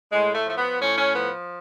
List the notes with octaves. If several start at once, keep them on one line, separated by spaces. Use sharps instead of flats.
A2 G#3
A3
F3 A3
B3
A2 C#4
C#4
F3 B3